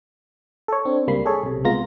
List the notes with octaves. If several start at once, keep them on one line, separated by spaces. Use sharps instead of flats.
A4 C#5
C4 D4
C#2 G3 A#3 B5 C7
G#4 A4 C#5
B1 C3
C2 G#3 B3 F4 A#5 A#6